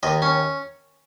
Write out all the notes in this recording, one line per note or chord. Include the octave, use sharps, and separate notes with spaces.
D#2 D#5
C#4